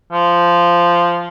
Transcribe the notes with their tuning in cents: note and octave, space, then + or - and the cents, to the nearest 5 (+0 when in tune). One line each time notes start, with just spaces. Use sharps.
F3 -10